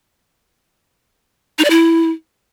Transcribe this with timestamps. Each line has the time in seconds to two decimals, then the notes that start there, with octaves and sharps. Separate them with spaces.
1.59 D#4
1.64 D5
1.70 E4